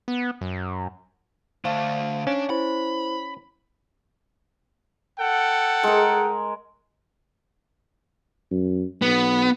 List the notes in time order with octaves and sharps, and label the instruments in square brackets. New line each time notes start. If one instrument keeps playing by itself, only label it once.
[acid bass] B3
F#2
[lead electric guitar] D3 A3 [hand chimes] C5 F5 A5
[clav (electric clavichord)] C#4 [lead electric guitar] D4
[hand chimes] E4 C5 [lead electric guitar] B5
[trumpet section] A4 F#5 G5
[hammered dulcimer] G#3 A#4
[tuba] F#2
[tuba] B1 [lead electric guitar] B3